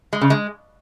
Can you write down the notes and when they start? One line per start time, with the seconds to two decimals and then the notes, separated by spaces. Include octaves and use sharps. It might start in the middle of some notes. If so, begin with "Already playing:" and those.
0.13 G#3
0.21 C#3
0.30 G#3